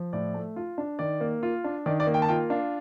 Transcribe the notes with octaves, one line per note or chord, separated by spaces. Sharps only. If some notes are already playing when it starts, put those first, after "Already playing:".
Already playing: F3
A2 D5
A3
F4
D4
D#3 D5
A#3
F4
D4
D#3 D5
D5
A#3
G5
A5
F4 G5
D4 F5